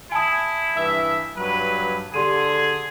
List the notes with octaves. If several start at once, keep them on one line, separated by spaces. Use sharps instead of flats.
E4 G#5 A5 D#6
G2 E3 E5
G2 F#3 B4
D3 G4 G#4 C6 D#7